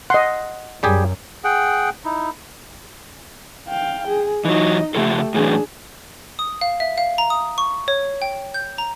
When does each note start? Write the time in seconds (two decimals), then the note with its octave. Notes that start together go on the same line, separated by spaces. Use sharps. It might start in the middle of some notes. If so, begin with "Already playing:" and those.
0.10 D#5 F#5 C6
0.83 F#2 G3 G4 G#4
1.44 G#4 F#5 G5
2.05 D#4 E4
3.68 F5 G5
4.08 G#4
4.45 E3 F#3 D#4 D#5
4.95 C#3 F3 A3 G4 A4
5.34 A2 E3 F#3 D4 G#4
6.39 D#6
6.61 F5
6.80 E5
6.98 F5
7.18 A#5
7.30 D#6
7.58 C#6
7.88 C#5
8.22 G5
8.54 G6
8.78 A#5